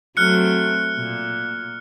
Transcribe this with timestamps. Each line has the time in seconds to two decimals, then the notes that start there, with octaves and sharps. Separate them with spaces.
0.17 F#3 A3 C4 F6 F#6 C#7
0.97 A#2